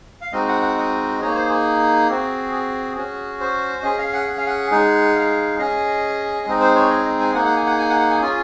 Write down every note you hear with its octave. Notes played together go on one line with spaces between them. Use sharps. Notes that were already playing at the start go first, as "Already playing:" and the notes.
F5
G#3 C4 D#4 F#4 D#5
F#5
F#5
D#5
A#3 D#4 G#4 C#5
C5
G#4
C4 F#4
G#4
C#4 F#4 G#4
C5
C#4 G#4 D#5
F5
F#5
F#5
F5
F#5
G#3 D#4 G#4
F5
C#4 G#4 D#5
G#3 C4 D#4 G#4
C5
C#5
D#5
G#5
A#3 D#4 G#4 F#5
F#5
G#5
F#5
G#5
F#5
F#5
G#5
C#4 F4 G#4 G#5